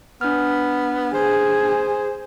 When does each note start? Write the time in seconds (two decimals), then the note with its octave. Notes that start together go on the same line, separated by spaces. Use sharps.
0.21 B3 D4 F6
1.14 G#4 C5